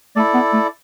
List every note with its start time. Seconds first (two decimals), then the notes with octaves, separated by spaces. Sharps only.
0.16 A3 E4 A4 D5
0.34 B3
0.53 A3